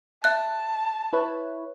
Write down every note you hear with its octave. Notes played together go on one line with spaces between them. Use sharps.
E5 A5 F#6
E4 B4 C#5